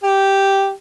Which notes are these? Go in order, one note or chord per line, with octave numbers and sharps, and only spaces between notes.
G4